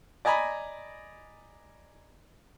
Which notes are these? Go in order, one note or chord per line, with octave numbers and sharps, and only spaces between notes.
D5 D#5 G#5 A#5 B5